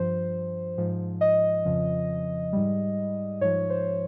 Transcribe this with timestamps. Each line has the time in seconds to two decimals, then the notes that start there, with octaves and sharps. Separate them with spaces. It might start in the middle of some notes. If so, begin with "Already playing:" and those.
Already playing: G2 F3 C5
0.77 G#2 F3
1.21 D#5
1.65 F2 C#3 F3
2.53 G#2 G3
3.41 G#2 F3 C#5
3.70 C5